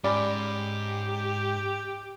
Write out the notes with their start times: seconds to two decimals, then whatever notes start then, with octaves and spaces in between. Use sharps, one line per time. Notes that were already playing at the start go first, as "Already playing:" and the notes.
0.04 G#2 C#4 G4 D5 B5